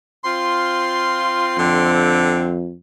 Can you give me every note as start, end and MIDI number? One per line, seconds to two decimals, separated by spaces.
0.24 1.56 60
0.24 1.56 65
0.24 1.91 84
1.58 2.74 41
1.58 2.59 50
1.58 2.59 60